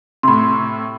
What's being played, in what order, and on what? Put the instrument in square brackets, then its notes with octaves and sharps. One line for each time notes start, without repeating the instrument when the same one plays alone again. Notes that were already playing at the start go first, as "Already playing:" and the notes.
[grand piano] A2 C3 [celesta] B5 C6